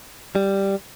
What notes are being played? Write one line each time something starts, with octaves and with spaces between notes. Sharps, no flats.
G3